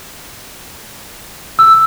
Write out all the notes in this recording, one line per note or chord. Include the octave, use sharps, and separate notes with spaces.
E6